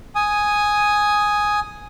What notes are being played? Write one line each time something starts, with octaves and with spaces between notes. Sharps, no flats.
G#5 D#6